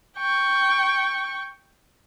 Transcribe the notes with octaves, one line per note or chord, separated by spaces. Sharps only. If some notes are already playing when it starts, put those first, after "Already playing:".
G5 C#6